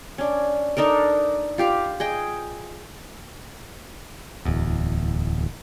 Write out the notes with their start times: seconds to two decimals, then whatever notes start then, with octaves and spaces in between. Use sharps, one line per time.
0.18 C#4 D4
0.77 D4 D#4 A4 A#4
1.58 F4 G4 F5
2.00 G#4 D#5 G5
4.45 D1 E2